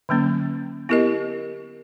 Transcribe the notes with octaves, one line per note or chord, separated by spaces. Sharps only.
D3 F#3 A#3 C#4
B3 E4 G4 A#4 D#5